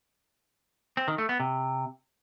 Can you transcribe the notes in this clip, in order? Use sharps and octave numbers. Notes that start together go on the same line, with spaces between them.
C4
D#3
A3
B3
C3